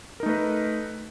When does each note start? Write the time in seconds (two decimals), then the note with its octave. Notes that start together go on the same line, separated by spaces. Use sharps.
0.20 A#4
0.23 D#4
0.26 A3
0.29 B4